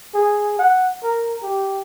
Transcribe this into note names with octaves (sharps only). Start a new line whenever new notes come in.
G#4
F#5
A#4
G4